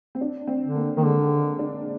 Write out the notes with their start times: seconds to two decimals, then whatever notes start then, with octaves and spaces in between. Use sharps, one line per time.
0.15 C4
0.21 D4
0.47 C4
0.62 D3
0.75 A#3
0.97 D#3 A#3
1.03 D3 G#3
1.59 D4